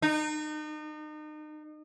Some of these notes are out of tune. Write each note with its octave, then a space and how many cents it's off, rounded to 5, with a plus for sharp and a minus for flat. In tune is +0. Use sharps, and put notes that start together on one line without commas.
D#4 -35